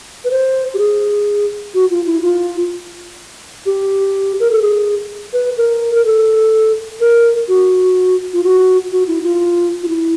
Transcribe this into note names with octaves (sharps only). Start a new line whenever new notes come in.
B4
C5
G4
G#4
F#4
F4
E4
F4
G4
A#4
A4
G#4
B4
A#4
A#4
A4
A#4
F#4
F4
F#4
F#4
E4
F4
F4
E4